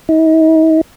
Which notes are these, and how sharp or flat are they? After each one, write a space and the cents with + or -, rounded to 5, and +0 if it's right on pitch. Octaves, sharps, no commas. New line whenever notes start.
D#4 +45